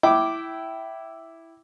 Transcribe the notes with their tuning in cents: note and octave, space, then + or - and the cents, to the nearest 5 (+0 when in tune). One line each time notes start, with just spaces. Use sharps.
E4 +0 G5 -20 D6 +0